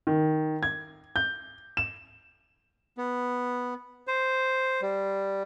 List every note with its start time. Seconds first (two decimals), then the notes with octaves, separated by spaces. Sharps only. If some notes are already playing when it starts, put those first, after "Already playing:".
0.07 D#3
0.63 G#6
1.16 G6
1.77 E7
2.98 B3
4.07 C5
4.82 G3